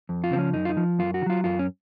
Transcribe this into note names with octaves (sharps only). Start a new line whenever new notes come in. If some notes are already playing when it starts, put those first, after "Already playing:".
F2
F4
C#3 F3 C4 C#4
F#2 D#4
F4
D#4
F3
F#2 F4
F#4
D#3
F#3 F4
F#2 F4
C#4